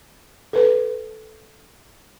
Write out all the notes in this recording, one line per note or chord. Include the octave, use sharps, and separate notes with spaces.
A4 B4